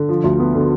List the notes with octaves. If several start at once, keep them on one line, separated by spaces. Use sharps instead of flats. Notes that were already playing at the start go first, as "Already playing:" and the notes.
Already playing: D3
F3
D2
B3
D3